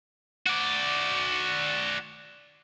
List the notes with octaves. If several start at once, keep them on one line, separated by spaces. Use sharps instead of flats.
F#4 D5